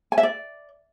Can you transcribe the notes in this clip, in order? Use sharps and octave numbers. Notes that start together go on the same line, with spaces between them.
G#5
E5
D5